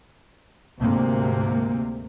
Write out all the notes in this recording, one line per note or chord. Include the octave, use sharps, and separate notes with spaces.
D2 G#2 C3 A#3